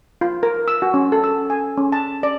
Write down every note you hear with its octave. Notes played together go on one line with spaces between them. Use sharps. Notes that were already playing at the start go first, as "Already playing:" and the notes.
F4
A#4
E6
F#4
C#4
A4
E6
G#5
C#4
A5
D5